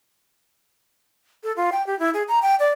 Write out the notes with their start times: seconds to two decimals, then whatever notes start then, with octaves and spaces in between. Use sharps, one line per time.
1.44 A4
1.57 F4
1.72 G5
1.87 G4
1.99 E4
2.14 G#4
2.28 A#5
2.42 G5
2.59 D5